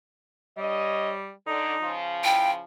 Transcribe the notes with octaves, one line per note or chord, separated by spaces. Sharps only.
G2 G3 C#5 D#5
D3 D#4
C#3 F3
E4 G5